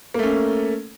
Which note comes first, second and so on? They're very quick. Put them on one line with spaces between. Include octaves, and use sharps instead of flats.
A#3 A3 C#4